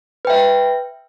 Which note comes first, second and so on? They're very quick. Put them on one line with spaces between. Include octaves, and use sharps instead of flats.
B4 G5 E5